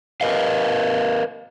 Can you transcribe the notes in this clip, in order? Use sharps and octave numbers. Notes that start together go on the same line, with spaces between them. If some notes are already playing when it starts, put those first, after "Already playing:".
A#4 B4 D#5 F5